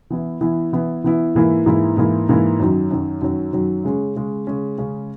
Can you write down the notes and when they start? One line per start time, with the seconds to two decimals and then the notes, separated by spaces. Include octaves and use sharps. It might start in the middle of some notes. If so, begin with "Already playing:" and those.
0.10 E3 B3 E4
0.41 E3 B3 E4
0.73 E3 B3 E4
1.04 E3 B3 E4
1.35 G#2 E3 A#3 E4
1.66 G#2 E3 A#3 E4
1.97 G#2 E3 A#3 E4
2.29 G#2 E3 A#3 E4
2.60 F#2 D#3 F#3
2.91 F#2 D#3 F#3
3.22 F#2 D#3 F#3
3.53 F#2 D#3 F#3
3.84 C#3 G#3 C#4
4.16 C#3 G#3 C#4
4.47 C#3 G#3 C#4
4.78 C#3 G#3 C#4